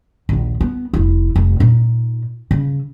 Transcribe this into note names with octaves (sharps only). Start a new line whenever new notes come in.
A#1 D#2
B3
F1 E4
F1
A#2 D#4
C#3